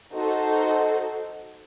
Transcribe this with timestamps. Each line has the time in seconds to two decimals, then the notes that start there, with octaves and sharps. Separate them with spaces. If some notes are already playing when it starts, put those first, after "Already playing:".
0.14 D#4 F#4 A4 C5